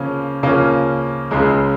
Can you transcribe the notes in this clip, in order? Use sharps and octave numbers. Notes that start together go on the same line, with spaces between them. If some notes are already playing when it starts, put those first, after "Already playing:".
Already playing: C#3 F3 A#3 C#4
C#3 F3 A#3 C#4
C#2 C#3 G#3